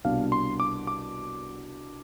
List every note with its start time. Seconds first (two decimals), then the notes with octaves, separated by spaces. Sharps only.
0.04 C2 B2 B3 D4 F5
0.32 C6
0.60 D6
0.87 D6